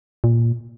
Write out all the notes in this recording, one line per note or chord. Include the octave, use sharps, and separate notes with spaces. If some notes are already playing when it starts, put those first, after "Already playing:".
A#2